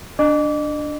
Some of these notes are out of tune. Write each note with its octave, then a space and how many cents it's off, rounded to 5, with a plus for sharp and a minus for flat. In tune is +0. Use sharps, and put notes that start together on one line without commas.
D4 +0 D#5 -40 D6 -25